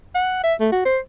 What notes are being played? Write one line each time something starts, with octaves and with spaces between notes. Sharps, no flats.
F#5
E5
A3
F#4
C5